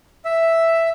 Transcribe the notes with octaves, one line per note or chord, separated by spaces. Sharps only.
E5